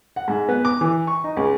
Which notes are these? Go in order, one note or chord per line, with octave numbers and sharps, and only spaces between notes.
F#5
G#2
B3
D6
E3
C#6
D#4
C#2